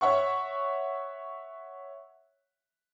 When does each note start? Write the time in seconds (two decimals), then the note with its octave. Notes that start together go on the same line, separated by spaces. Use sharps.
0.01 C#5 E5 F#5 C#6